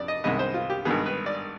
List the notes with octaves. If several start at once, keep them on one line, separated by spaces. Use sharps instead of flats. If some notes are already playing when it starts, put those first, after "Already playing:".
Already playing: F2 D5
D#5
C2 C3 D#3 G#3 B3 D#5
C5
F4
G4
G#1 G2 D#3 B3 G#4
B4
D5